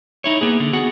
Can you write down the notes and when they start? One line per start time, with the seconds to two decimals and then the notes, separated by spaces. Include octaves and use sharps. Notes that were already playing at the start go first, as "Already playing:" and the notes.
0.24 D#4 E4 C#5
0.41 A#3 B3 G#4
0.60 D3
0.73 B3 F#4 G#4 F#5